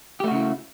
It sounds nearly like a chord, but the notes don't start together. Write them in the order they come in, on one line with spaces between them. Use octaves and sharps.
G4 A3 F#4 C#3 E4